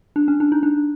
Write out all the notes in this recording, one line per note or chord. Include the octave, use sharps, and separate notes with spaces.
D4
C#4
D4
D#4
D4